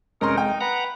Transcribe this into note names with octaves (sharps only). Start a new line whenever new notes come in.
F1 G#3 C#4 D#4 A#4 A#5 C6
G#3 G5
B4 F#5 A#5